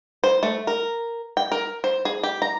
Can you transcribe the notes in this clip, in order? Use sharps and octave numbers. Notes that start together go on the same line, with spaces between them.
C5
A3
A#4
G5
A#4
C5
G#4
G4
A#5